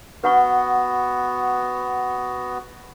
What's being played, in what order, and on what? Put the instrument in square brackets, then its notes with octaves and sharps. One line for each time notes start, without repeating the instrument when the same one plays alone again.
[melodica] B3 F#4 [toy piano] B4 F#5 C#6